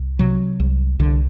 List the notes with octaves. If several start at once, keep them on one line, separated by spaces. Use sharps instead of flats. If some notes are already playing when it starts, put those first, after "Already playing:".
Already playing: C2
C3 F#3
C2
C2 D3